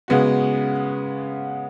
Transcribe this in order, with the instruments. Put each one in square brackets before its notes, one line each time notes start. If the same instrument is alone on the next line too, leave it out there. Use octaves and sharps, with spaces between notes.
[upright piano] C#3 G#3 B3 F#4